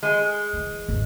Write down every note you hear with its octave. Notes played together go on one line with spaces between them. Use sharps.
G#3
E3 F#3
G#1 E2